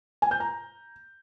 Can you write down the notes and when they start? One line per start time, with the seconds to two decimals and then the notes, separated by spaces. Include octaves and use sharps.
0.22 G#5
0.31 G6
0.40 A#5